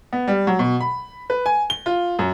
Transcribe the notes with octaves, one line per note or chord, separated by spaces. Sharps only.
B3
G3
F#3
B2
B5
B4
G#5
G7
F4
F#2